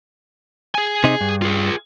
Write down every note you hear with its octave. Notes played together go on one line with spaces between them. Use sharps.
G#4 G#5
C3 D#4
G2
F4 G#4